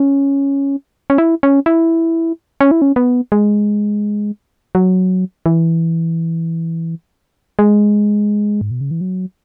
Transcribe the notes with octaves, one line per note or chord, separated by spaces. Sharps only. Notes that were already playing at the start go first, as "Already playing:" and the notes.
Already playing: C#4
C#4
E4
C#4
E4
C#4
E4
C#4
B3
G#3
F#3
E3
G#3
G#2
B2
C#3
E3
F#3